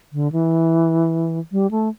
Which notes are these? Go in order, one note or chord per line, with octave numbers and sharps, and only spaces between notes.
D3
E3
G3
A3